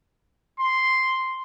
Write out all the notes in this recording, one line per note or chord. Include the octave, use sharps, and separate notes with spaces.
C6